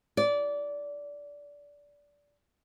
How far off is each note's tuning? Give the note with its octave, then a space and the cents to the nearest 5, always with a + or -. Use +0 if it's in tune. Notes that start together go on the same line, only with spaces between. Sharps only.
D5 -20